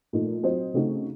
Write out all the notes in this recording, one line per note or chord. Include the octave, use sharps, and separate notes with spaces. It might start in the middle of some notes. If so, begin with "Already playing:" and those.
A#2 F3 A3 D#4
F#3 C4 F4 C5 D#5
C#3 A3 C4 D#4 F#4